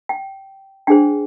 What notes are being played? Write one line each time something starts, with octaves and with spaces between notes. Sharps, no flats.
G5
D4 G#4 C5 G5